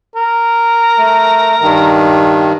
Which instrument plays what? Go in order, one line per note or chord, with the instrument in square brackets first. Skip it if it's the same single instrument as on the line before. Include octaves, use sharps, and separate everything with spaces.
[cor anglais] A#4
[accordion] A3
G2 D#3